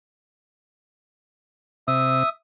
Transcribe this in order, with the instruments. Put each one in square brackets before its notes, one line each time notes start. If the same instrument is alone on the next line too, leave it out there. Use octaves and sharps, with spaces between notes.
[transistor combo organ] C3 [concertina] E5 D#6